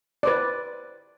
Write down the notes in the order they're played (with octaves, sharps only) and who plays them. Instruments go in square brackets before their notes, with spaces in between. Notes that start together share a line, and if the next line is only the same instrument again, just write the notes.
[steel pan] B4 C5 D5